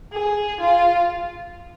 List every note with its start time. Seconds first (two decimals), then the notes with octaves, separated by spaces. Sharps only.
0.13 G#4
0.60 F4